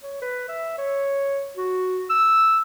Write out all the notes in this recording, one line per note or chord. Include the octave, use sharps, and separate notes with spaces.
C#5
B4
E5
C#5
F#4
E6